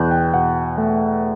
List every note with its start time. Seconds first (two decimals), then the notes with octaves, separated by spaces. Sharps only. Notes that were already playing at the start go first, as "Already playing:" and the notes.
Already playing: E2 B2 F#6 G6
0.11 G5
0.34 B2 F#5
0.78 A3